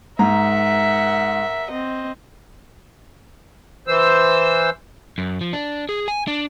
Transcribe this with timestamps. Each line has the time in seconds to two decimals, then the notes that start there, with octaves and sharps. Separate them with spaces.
0.19 G#2 A#4 E5 F#5 A#5
1.70 C4 D#5
3.87 E3 C5 E6
5.18 F#2
5.41 F3
5.53 D4
5.89 G#4
6.08 G#5
6.27 D4